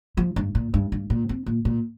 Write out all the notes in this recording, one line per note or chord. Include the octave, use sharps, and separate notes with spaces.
F3
G2
A#2
G2
G2
A#2
C4
A#2
A#2